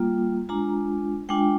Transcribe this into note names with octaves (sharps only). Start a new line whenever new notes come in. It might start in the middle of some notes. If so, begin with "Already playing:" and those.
Already playing: G3 A#3 F4
G#3 D4 F4 A#5
G#3 D4 F4 G5